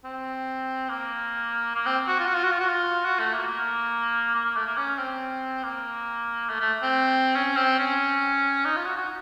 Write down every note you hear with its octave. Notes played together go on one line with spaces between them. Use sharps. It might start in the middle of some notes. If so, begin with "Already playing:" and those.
C4
A#3
A#3
C4
F#4
F4
F#4
F4
F#4
F4
F#4
F4
F#4
A3
A#3
A#3
A#3
A#3
A3
A#3
C#4
C4
A#3
A3
A3
C4
C#4
C4
C#4
D#4
F4
F#4
F#4